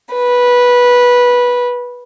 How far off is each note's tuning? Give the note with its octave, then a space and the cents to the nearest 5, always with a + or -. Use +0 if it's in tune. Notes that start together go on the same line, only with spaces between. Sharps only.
B4 -15